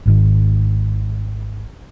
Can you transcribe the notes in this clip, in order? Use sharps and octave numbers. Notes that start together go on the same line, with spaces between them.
G#1 G#2 D#3